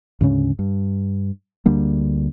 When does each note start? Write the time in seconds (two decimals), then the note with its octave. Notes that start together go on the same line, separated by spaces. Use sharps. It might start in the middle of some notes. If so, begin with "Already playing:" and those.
0.21 D2 G#2 C#3 C#4
0.59 G2
1.66 D2 D3 G3 A#3